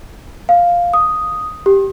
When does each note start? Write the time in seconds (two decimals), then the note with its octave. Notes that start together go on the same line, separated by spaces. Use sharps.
0.49 F5
0.94 D#6
1.66 G4